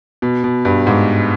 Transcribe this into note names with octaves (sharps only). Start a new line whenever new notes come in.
B2
B2
G2
G#2